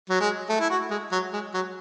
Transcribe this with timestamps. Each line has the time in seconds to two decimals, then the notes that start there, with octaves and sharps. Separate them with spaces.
0.09 F#3
0.20 G#3
0.49 A3
0.60 E4
0.70 F#4
0.90 G#3
1.12 F#3
1.33 G#3
1.53 F#3